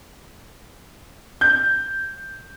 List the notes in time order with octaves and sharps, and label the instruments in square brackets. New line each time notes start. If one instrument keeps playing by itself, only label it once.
[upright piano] G6